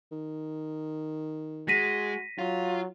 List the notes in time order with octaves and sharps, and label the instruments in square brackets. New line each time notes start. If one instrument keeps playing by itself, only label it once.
[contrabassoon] D#3
[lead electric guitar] G#3 [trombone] F#4 [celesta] A#6 B6 D#7
[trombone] F#3 [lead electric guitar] F4